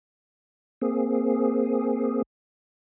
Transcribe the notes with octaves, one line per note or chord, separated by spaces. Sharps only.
A#3 C4 G#4